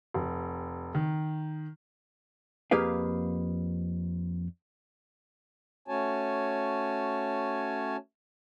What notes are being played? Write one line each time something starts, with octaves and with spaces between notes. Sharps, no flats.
F1
D#3
F2 A#3 G4 G#4 B4 F5
A3 C#4 F#4 C#5 G#5 A5